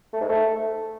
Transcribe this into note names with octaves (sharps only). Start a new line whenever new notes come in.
A3
G#2
A3